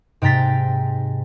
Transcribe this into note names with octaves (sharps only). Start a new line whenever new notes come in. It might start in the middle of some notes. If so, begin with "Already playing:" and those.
G#2 C3 G5 A#5 A6 B6